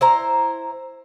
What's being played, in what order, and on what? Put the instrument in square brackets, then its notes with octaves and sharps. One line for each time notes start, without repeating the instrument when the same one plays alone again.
[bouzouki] E4 C5 A#5